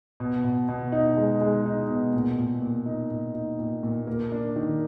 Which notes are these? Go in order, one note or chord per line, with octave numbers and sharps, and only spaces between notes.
B2
B2
B2
D#4
G#3
G#3
D#4
B2
A#2
A#2
A#2
D#4
A#2
D#4
A#2
A#2
A#3
D4
D#3